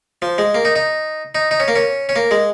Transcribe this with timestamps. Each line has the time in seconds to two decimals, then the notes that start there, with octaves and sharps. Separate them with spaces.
0.22 F3
0.38 G#3
0.55 A#3
0.65 D#4
0.76 D#4
1.35 D#4
1.51 D#4
1.60 C#4
1.68 A#3
1.76 C#4
2.09 C#4
2.16 A#3
2.31 G#3